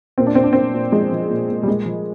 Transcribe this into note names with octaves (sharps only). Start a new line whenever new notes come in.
A#2 C4
D4
A#2 C4
D4
A#2 C4
A#2
F3 G#3
F3
A#2
A#2
G3
A#2 G#3
F3